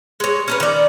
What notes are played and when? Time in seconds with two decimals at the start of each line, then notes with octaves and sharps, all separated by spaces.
0.20 G#3 C#5
0.48 C#4 A#4 B4
0.60 D#3 D5